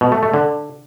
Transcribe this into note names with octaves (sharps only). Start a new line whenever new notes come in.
B2
A3
A3
D3